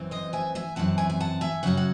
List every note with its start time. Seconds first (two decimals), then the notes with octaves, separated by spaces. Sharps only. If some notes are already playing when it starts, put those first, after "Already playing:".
Already playing: F#2 E3 C4
0.11 C5 D#5
0.33 E5 G#5
0.55 E5 G#5
0.76 F#2 E3 C4 F#5 A5
0.98 E5 G#5
1.10 G#5
1.20 F#5 A5
1.41 E5 G#5
1.63 F#2 C#3 F#3 C#4 F#5
1.77 F#5